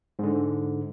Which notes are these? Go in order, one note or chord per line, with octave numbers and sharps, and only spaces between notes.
G#2 D3